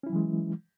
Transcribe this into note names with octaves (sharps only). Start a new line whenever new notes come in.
E3 F#3 G#3 C#4 E4